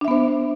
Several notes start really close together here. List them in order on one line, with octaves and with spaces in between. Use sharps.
D4 E5 B3 C5